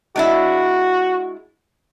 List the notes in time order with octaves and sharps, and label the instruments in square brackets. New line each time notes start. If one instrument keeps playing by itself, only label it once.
[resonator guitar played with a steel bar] G#3 D4 E4 [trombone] F#4